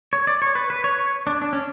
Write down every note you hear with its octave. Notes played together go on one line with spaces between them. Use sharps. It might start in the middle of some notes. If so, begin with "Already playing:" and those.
C#5
D5
C#5
B4
B4
C#5
C#5
D4
D4
C#4